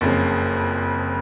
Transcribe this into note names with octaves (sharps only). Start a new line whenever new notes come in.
F#1 F2 C#3